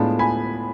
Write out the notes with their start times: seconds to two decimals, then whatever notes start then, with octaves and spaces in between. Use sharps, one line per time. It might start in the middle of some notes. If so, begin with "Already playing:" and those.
Already playing: A2 G#3 B3 D4 F4 A5
0.19 G#5 B5